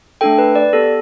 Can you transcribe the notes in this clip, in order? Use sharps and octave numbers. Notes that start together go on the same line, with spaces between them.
A3 D4 A4 G5
B4
D5
B3 G4 A4